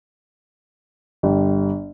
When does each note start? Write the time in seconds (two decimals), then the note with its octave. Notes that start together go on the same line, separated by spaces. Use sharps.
1.23 G1 G3